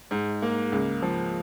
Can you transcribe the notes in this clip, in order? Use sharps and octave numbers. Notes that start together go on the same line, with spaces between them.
G#2
A#3
C#2
F3